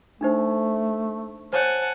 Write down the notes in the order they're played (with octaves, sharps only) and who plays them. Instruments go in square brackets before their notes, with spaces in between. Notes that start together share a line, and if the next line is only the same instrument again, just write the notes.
[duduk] A3 [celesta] D4 D#4 C5
[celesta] C5 C#5 [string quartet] F#5 G#5 A5